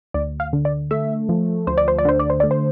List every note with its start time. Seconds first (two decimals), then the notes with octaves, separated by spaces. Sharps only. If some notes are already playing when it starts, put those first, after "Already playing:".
0.14 D2 D5
0.40 F5
0.53 D3
0.65 D5
0.91 A3 E5
1.29 F3
1.67 D2 C5
1.78 D5
1.88 C5
1.98 D5
2.05 D3 C5
2.19 D5
2.30 C5
2.40 A3 D5
2.51 C5